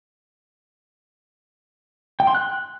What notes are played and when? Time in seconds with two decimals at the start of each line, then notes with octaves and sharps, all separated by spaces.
2.20 G5
2.27 C6
2.35 F#6